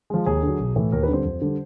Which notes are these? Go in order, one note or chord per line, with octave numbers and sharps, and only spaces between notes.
F3 G#3
D#2 G#4
D3 F#3
B1
A2 E3
D#2 A#4
B4
D3 G3 C4 C5
F2
D3 G3